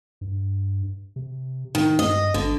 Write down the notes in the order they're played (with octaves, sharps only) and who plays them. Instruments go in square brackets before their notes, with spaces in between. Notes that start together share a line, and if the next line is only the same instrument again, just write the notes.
[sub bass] G2
C3
[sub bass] A2 [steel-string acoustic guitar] D#3
[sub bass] G2 [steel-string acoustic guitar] D#5
[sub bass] G#1 [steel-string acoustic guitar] D3